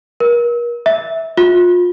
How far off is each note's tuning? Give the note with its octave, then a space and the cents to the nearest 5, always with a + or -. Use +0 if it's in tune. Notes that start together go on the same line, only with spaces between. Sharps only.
A#4 +35
E5 -20
F4 +30